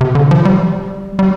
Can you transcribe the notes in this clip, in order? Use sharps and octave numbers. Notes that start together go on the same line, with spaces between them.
C3
D3
F3
G3
G3